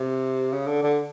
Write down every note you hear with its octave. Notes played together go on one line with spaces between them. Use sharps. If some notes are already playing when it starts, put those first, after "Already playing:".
Already playing: C3
C#3
D3
D3